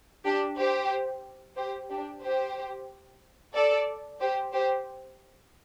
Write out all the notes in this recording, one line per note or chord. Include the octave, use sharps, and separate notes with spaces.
D4 G4
G4 C5
G4 C5
D4 G4
G4 C5
A4 D5
G4 C5
G4 C5